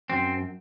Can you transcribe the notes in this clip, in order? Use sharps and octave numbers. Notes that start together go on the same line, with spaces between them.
F#2 C4